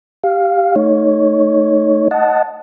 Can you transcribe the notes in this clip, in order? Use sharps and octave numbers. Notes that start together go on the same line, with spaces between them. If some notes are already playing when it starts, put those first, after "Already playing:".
G4 F5
A3 D#4 C#5
D#5 F#5 A5